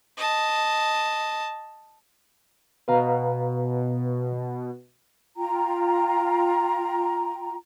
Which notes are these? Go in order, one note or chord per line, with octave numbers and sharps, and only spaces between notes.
D#5 A5
B2 B4 F5 A#5
F4 G5 A#5